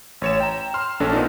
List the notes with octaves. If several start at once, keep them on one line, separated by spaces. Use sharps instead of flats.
A1 C#5 E7
G5 A#5
C6 F6
A#1 C#4 D4 A4
A#2 B3 D#4